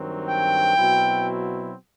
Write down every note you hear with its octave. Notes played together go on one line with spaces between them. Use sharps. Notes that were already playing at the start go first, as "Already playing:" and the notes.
Already playing: G2 D#3 F#3 C4
G5
B2 F#3 C4 E4